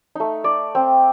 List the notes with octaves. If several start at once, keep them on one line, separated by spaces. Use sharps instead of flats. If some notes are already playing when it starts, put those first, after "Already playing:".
A3 D#4
D5
C4